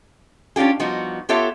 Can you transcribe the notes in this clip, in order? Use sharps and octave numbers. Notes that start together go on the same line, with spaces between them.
C#4 D4 F4 G4 G#4
F3 G3 B3 D#4 F#4
B3 F4 G4 A4 C#5 E5